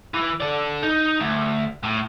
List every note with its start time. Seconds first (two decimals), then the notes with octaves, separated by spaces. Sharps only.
0.14 E3
0.41 A4 D5
0.82 D#4
1.20 D2
1.84 A2